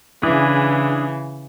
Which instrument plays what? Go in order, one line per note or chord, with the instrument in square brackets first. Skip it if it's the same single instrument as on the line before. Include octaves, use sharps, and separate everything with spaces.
[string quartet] C#3 E3 [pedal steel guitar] D4 E4 G#4